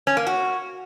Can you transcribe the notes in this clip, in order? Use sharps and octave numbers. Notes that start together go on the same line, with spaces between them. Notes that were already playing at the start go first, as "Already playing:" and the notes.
C#4
A#3
F#4